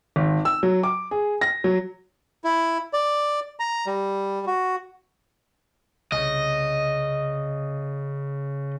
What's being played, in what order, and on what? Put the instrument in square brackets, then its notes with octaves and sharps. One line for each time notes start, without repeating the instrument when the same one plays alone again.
[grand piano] G#1
E6
F#3
D6
G#4
A#6
F#3
[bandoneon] E4
D5
A#5
G3
F#4
[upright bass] C2 [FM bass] C#3 [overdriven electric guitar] D#5